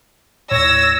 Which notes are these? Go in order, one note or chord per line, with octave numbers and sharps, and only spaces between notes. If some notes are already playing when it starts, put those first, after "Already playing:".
D#2 A2 C#5 E6 A#6